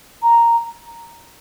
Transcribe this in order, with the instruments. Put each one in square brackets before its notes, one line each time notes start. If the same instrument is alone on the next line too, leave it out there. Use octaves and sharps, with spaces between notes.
[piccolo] A#5